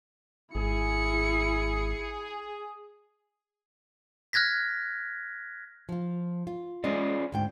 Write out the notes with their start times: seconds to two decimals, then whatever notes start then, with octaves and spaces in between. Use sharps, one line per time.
0.55 G#1 E4 G#4 C#7
4.33 F6 F#6 G#6 A#6 B6
5.89 F3 F4
6.47 F4
6.84 G#3 C#4 F4 D5 D#5
7.32 D2 G#2 G5